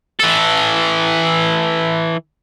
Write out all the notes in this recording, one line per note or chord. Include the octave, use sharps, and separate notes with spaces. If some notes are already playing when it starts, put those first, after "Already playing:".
E3 A4